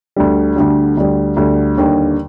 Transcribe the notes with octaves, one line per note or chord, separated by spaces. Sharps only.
D2 D3 G3
D2 D3 G3
D2 D3 G3
D2 D3 G3
D#2 D3 G3